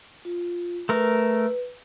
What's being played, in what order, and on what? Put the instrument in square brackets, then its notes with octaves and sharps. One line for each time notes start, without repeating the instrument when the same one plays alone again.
[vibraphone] F4
[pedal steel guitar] A3 A#4 [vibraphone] B4